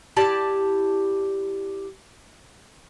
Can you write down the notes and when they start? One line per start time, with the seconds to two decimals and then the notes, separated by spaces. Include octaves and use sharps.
0.16 E4 G4 D5 A5